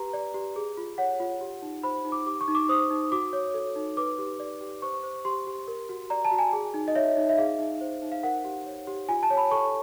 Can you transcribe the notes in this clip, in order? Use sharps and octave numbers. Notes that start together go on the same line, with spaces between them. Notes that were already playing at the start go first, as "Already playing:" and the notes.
Already playing: G4 B4 A#5
D5
G4
G#4
F4
C#5 F#5
F4
G4
D#4
C5 B5
D#4
D6
G4 D6
C#6
D#4
D6
C5 D#6
D#4
F#4 D6
C#5
A4
D#4
B4 D6
G4
D5
G4
C5 C#6
C5
G4 C6
G4
A#4
F#4
D5 A#5
A5
F#4
G#5
G#4
D#4
D#5
C#5 E5
D#4
E5
G#4 F5
D#4
C5
D#4
F5
A#4 F#5
G4
C#5
G4
F4 G#5
A5
C#5
B5
A4 C#6